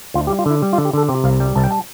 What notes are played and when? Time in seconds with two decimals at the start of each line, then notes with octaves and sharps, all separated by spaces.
0.14 D2 F4
0.27 G4
0.30 G3
0.39 F4
0.46 D3 E4
0.62 G3
0.73 F4
0.78 D3
0.85 G4
0.93 D3 A4
1.09 C3 G4
1.24 C2 F5
1.40 G3 G5
1.55 C2 A5
1.64 G5
1.71 A5